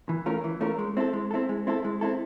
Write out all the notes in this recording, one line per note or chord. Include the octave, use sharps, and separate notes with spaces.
E3
A3 C#4 F4 A#4
E3
A3 C#4 F4 A#4
G#3
C4 E4 A4
G#3
C4 E4 A4
G#3
C4 E4 A4
G#3
C4 E4 A4